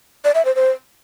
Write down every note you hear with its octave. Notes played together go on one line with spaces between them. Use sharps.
D5
E5
C5
C5